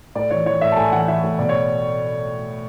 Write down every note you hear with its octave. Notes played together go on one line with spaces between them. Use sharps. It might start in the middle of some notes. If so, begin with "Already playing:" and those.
A2 D5
E3 C#5
E3 C#5
A2 E5
A5
A2 G#5
E3 F#5
E3 E5
A2
B2 D5
C#5